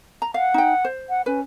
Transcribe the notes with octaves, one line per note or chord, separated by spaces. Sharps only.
A#5
F5 F#5
D#4 G5
C5
F#5
C#4 B4